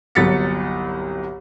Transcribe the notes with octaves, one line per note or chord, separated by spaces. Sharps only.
G1 C2 F#3 A6 B6 C#7